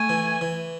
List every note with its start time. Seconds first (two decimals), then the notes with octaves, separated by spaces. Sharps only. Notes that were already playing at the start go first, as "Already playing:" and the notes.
Already playing: A3 G#5
0.09 E3
0.41 E3